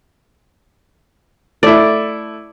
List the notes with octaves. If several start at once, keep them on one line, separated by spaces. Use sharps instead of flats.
A3 E4 D5